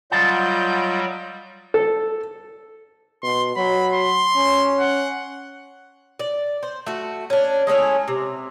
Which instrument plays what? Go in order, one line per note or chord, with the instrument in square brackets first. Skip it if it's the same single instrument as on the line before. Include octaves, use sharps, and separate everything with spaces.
[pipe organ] F#3 G3 [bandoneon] F4 D#5 G6 [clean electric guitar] F#5 A5 C6
[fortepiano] A4
[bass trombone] B2 [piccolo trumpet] C6
[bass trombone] F#3 [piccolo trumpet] B5
[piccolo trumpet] C6
[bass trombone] C#4
[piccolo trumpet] F#5
[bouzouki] D5
C5
A3 F#4
C#4 D4
G#3 A3 C#4 E4
C3